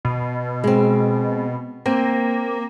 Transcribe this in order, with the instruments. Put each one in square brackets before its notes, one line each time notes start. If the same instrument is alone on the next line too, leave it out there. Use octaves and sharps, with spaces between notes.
[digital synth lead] B2
[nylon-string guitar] G#3 C4
[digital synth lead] A#3 [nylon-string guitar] C4